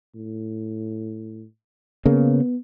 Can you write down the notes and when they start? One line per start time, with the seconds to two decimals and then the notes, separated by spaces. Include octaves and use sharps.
0.15 A2
2.06 C#3 A#3 B3